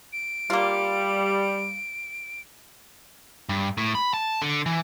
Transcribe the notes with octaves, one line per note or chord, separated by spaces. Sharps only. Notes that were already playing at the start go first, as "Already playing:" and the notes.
D7
G3 A#3 F4
G2
A2
B5
A5
D3
E3